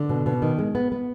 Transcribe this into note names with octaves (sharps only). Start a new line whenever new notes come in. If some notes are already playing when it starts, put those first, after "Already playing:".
Already playing: D3
B2
B2
D#3
G#3
B3
B3